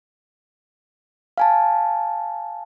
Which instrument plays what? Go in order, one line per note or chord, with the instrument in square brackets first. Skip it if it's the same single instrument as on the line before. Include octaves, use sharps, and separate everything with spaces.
[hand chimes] F5 G#5 A5